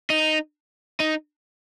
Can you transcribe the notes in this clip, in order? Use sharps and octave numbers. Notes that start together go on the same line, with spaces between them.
D#4
D#4